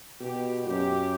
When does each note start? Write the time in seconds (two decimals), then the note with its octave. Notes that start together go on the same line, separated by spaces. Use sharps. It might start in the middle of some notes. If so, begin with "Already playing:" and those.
0.21 B2 G4
0.66 F#2 G4